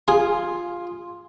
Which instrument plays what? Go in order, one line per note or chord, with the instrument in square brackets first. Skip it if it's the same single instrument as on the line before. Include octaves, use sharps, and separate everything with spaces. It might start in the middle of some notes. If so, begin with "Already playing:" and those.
[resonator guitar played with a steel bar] F4 [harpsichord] G#4 C6